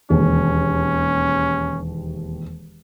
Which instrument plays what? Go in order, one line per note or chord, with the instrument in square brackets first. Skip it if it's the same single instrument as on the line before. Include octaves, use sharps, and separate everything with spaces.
[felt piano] E1 D#2 [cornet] C#4